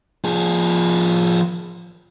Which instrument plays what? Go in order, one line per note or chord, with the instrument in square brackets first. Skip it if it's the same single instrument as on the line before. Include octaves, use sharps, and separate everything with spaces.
[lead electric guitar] F3 G#4